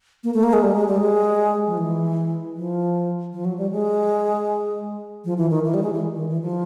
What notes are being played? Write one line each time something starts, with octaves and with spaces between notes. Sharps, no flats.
A#3
A3
A#3
G#3
G3
G#3
G3
G#3
F3
E3
F3
F3
F#3
G3
G#3
F3
E3
D#3
E3
G3
G#3
E3
D#3
E3
F3